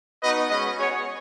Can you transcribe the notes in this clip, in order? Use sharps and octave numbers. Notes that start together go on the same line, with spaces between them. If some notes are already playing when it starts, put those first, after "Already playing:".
B3 D#4 F#4 B4 D#5
G#3 C#4 F#4 B4 D#5
B3 F#4 G#4 C#5